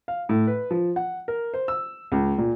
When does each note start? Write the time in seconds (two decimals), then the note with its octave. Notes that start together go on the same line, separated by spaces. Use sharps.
0.08 F5
0.29 A2
0.47 B4
0.71 F3
0.96 F#5
1.28 A#4
1.54 C5
1.68 E6
2.12 C#2
2.38 A#2